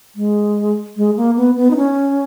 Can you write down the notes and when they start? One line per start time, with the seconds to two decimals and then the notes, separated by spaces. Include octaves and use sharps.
0.16 G#3
0.97 G#3
1.17 A#3
1.37 B3
1.57 B3
1.71 D#4
1.77 C#4